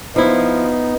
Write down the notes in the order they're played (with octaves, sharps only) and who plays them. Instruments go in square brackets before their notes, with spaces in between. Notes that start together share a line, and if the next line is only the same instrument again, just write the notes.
[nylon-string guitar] F3 E4 [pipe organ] B3 D#4